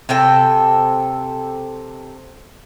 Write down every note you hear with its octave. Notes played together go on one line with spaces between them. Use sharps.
C3 A4 G5